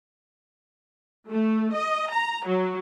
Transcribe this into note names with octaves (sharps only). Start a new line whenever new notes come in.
A3
D#5
A#5
F#3